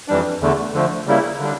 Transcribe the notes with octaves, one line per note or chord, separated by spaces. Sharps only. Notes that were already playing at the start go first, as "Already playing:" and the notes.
F2 E3 G3 D4
E2 D3 A3
D3 F3 A3
C#3 G3 A#3 E4
D3 G3 D4